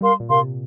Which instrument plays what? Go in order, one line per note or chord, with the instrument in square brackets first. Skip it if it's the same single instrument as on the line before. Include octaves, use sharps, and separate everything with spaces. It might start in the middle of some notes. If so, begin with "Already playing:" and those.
[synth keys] G3 [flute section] A#4 F5 C6
[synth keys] A#2
[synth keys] C3 [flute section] A#4 F5 C6